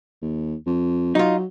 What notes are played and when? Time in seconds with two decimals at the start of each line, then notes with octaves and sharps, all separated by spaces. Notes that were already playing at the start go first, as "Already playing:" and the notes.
0.22 D#2
0.66 F2
1.15 F#3 D#4 F4